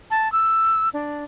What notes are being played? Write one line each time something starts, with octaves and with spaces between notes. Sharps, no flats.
A5
E6
D4